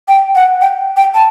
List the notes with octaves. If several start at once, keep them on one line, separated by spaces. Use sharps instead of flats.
G5
F#5
G5
G5
A5